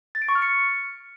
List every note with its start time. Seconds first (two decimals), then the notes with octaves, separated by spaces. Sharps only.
0.15 A6
0.22 D7
0.29 C#6
0.35 F6
0.42 C#7